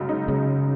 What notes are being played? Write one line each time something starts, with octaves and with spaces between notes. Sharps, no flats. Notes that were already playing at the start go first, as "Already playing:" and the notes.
Already playing: F#2 C#3 G#3
D#4
C#3 G#3